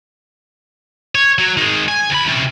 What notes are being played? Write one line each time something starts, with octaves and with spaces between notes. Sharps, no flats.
C#5
F#3
D#3 G#3
G#5
D2 B5
C3 C#4